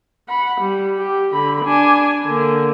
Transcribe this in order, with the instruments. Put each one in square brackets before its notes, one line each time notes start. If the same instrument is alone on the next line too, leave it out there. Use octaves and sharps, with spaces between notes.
[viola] F#5 B5
G3
G4
D3 B5
D4 G#5
D3 A#3